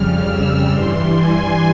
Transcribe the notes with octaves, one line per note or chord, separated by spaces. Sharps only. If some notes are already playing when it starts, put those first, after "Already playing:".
Already playing: F2 C#3 G3 F6
E6
G2 E3 G3 C6
G#5